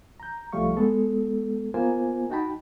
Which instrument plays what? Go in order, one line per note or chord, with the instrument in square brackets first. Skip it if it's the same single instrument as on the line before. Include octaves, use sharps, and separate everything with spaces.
[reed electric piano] A#5 G6
C2 F3 G3 A3 F5 C#6
G#3 B3 A4
A#3 B3 F4 A#4 C5 G#5
D#4 F#4 G5 A5 B5